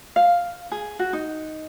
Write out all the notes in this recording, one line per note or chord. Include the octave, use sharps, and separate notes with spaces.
F5
G#4
F#4
D#4